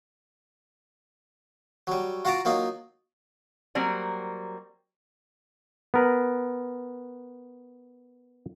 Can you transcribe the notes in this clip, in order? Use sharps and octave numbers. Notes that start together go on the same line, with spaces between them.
F#3 G3
F4 F#4 F#5 A5 A#5 D6
F#3 A#3 D#4 F4
F#3 G3 A#3 C4 D5
B3 A#4 B4